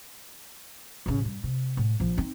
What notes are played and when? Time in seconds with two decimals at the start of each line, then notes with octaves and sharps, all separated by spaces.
1.06 A1 C#3
1.25 G2
1.43 C3
1.77 A2
2.00 A#1 F3
2.17 C4 D#4